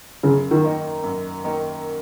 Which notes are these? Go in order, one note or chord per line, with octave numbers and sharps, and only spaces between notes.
F#2 C#3
D#3
D#3 A#3 D#4
F#2
D#3 A#3 D#4